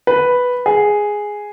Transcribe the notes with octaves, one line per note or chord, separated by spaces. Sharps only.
B4
G#4